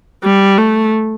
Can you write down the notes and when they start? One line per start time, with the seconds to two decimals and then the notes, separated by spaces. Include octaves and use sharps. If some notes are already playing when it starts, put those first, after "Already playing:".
0.24 G3
0.58 A3